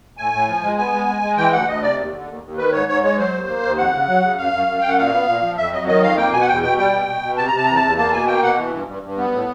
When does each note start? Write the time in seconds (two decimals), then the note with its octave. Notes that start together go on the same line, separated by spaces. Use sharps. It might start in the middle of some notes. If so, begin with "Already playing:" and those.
0.18 A2 G#5
0.33 A2
0.48 F3
0.62 G#3
0.78 B3 G#5
0.93 G#3
1.08 G#3
1.22 G#3
1.37 E3 G5
1.52 D2 F#5
1.68 D2 D#5
1.82 C3 D5
1.98 D#2
2.12 D3
2.28 D#2
2.43 D#2
2.57 D#3 B4
2.72 G#2 C#5
2.87 G#2 C#5
3.03 G#3 C#5
3.18 F#3 C5
3.33 D#2
3.47 A#3
3.63 D#2
3.77 F2 F#5
3.93 C#3
4.08 F#3
4.22 C#3
4.38 F#2 F5
4.52 F#2
4.67 F#2
4.80 F#2 G5
4.88 F#5
4.98 A#2 F5
5.13 B3
5.28 A#2
5.43 F3
5.57 F2 E5
5.72 F#3 D#5
5.87 D#3 D#5
6.02 F2 F5
6.17 A#3 G5
6.32 B2 G#5
6.41 F#5
6.47 E2 G5
6.62 B2 G5
6.78 G3 G5
6.93 B2
7.08 B2
7.22 B2
7.37 C3 A5
7.47 A#5
7.53 C3 A5
7.66 E2 A#5
7.76 A5
7.82 E2
7.97 A#3 A5
8.12 B2 G#5
8.27 A#3 G5
8.43 B2 F#5
8.57 E3
8.73 G2
8.88 G2
9.03 G2
9.18 B3
9.32 A2